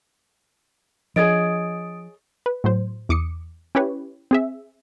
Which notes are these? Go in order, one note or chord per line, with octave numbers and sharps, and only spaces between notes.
F3 D4 G#4 C#5 D#5 D#6 A6 D7
B4
A2 F#3 C5
E2 D6 D#6 C#7
C#4 E4 G4 B4 C#5
C4 G#4 E5